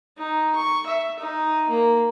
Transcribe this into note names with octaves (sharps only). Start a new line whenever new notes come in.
D#4
C#6
E5
D#4
A#3